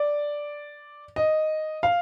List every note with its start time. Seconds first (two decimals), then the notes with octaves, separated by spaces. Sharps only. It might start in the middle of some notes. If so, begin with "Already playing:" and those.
Already playing: D5
1.16 D#5
1.83 F5